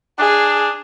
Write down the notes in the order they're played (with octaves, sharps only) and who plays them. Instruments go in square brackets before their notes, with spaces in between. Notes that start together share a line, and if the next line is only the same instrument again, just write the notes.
[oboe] D4 [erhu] G#4